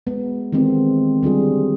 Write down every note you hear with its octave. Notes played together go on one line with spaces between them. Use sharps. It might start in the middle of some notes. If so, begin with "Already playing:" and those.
G#3 B3
D#3 E3 G#3 C4
D3 G3 F4 G#4